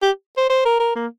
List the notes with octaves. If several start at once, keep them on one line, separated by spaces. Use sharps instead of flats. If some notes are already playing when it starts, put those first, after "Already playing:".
G4
C5
C5
A#4
A#4
A#3